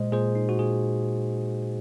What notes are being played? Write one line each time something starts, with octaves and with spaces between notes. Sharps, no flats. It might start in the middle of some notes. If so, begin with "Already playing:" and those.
Already playing: A#2 G#3 C5 D#5
A#2 G#4 C5
D#4
F#4
A#2 G#4